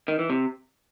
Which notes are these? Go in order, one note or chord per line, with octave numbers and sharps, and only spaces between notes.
D#3
E3
C3